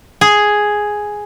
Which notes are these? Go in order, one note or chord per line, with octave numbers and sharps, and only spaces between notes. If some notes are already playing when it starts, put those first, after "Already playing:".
G#4